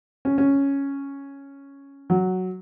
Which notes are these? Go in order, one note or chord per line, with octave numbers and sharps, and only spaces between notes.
C#4
C#4
F#3